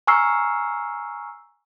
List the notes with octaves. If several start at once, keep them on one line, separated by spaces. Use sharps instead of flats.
G#5 A#5 C#6 E6 F6 C7